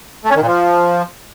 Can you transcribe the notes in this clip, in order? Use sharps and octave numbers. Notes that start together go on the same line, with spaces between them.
A3
C#4
D#3
A#2
F3